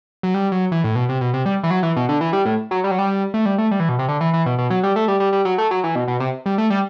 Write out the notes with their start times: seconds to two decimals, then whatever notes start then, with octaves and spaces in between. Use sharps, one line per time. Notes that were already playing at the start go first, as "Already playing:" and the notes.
0.23 F#3
0.34 G3
0.52 F#3
0.72 E3
0.84 A2
0.95 B2
1.09 C3
1.21 B2
1.34 C3
1.46 G3
1.63 E3
1.71 F#3
1.83 E3
1.96 B2
2.09 D3
2.21 E3
2.33 G3
2.45 A2
2.71 F#3
2.84 G3
2.91 F#3
2.99 G3
3.34 A3
3.46 G3
3.58 A3
3.71 G3
3.80 E3
3.89 B2
3.99 C3
4.08 D3
4.21 E3
4.33 E3
4.46 B2
4.58 B2
4.70 F#3
4.83 G3
4.96 A3
5.08 G3
5.20 G3
5.33 G3
5.45 F#3
5.58 A3
5.71 F#3
5.84 E3
5.95 B2
6.08 B2
6.20 C3
6.46 G3
6.58 A3
6.70 G3